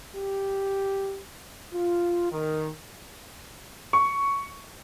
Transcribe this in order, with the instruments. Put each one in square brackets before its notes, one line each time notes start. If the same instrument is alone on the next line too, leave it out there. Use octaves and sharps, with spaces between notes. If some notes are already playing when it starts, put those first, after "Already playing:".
[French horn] G4
[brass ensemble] F4
D#3
[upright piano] C#6